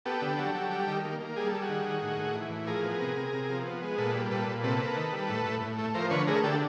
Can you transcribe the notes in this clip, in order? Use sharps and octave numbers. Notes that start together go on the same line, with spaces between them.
B3 G4 A4
D3
F#3
F#3
G3
D#3
A#3
A#3
G3 G#4
G3 A4
F#4 G#4
D#3
D#3
A2
A2
E3
A2
F3 G#4 A#4
B3
C3
C3
C3
F3
B3
G#3
A#2 A4 B4
G3
A#2 A4 B4
A#2
C3 A4 B4
A#3
D#3
G3
A2
A2
A2
A3
F3 A#4 C5
D3 B4 C#5
A3 G#4 A#4
D3 G4 A4